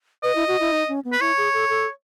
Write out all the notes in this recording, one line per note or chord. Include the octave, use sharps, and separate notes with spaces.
B4 D#5
E4
F#4
E4
D#4
C#4
B3
B4
E4 C#5
G#4
A4
A4